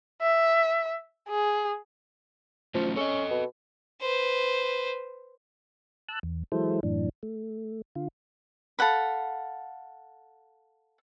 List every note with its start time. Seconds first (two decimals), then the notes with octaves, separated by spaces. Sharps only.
0.22 E5
1.29 G#4
2.74 F3 F#3 A3 C#4
2.96 C#4 A4 D#5
3.30 B2
4.01 B4 C5
6.09 A5 E6 F#6
6.23 E2
6.52 E3 F#3 G#3 E4 A4 C5
6.83 F#2 A2 E3 D4
7.23 A3
7.95 D3 F4
8.79 A4 F5 F#5 B5